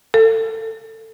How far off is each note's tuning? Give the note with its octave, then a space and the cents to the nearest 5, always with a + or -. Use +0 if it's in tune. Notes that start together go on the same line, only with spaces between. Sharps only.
A4 +20